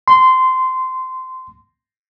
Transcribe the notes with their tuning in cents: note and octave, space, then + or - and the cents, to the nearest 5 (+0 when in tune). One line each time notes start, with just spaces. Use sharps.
C6 -15